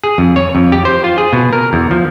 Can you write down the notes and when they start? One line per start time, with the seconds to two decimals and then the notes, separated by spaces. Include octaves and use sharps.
0.04 G#4
0.18 F2
0.36 C#5
0.55 F2
0.72 G4
0.85 C5
1.04 F4
1.18 G#4
1.33 B2
1.53 A#4
1.73 E2
1.91 F3